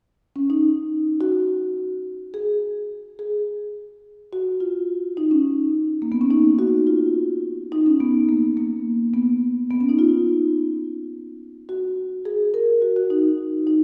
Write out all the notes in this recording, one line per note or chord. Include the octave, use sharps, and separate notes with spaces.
C#4
D#4
F#4
G#4
G#4
F#4
F4
D#4
C#4
A#3
B3
C#4
D#4
F#4
F4
D#4
C#4
B3
A#3
A#3
B3
B3
C#4
D#4
F4
F#4
G#4
A#4
F#4
F#4
D#4
D#4